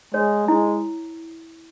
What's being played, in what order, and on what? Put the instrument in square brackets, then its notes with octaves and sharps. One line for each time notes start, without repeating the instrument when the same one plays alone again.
[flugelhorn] G#3 [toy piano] C#5
[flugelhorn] G#3 [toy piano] E4